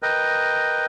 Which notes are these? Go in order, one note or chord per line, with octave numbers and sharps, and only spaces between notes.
A#4 B4 D#5 G5